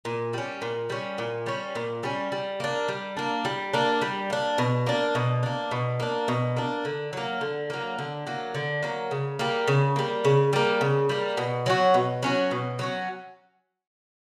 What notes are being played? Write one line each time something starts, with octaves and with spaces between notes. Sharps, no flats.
A#2
G3 C#4
A#2
G3 C#4
A#2
G3 C#4
A#2
G3 C#4
G3
A#3 D4
G3
A#3 D4
G3
A#3 D4
G3
A#3 D4
B2
A#3 D4
B2
A#3 D4
B2
A#3 D4
B2
A#3 D4
D3
F#3 A#3
D3
F#3 A#3
D3
F#3 A#3
D3
F#3 A#3
C#3
G3 A#3
C#3
G3 A#3
C#3
G3 A#3
C#3
G3 A#3
B2
F#3 C#4 F#4
B2
F#3 C#4 F#4
B2
F#3 C#4 F#4